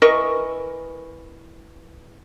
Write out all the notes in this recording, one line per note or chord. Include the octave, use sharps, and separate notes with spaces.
E3 A#4 D#5 C#6